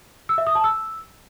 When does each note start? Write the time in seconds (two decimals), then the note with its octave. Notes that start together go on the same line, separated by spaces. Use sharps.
0.29 E6
0.38 E5
0.47 D#6
0.55 A5
0.64 E6